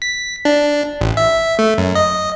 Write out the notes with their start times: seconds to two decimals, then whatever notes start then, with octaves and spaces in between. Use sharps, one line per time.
0.02 B6
0.45 D4
1.01 A1
1.17 E5
1.59 A3
1.78 F#2
1.95 D#5